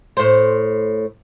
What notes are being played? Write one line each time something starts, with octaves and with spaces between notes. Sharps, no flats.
A2 C5